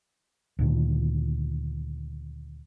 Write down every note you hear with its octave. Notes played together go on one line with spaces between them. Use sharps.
D2 A#2 D#3